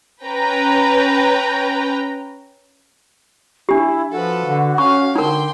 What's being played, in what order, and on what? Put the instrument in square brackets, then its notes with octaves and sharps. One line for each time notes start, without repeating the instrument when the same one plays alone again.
[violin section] C#4 B4 G5 A#5
[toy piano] D4 G4 [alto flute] E4
[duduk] F3 [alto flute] F#4 [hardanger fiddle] A4 B4
[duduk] D3
[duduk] C#4 [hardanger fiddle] F5 [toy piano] C#6
[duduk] D3 [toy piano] D#4 A#4 [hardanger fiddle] G5 C6